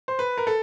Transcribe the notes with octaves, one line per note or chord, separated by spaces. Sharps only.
C5
B4
A#4
A4